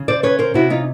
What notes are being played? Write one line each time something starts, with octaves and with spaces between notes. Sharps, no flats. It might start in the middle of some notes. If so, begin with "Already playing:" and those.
Already playing: C#3
C5 D5
C#4 B4 C#5
A#4 C5
C3 E4 F#4
D#4 F4